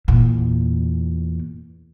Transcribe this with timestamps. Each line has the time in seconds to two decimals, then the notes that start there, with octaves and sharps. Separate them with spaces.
0.08 E2 A#2